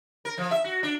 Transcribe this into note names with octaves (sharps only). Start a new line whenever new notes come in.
A#4
F3
E5
F#4
D4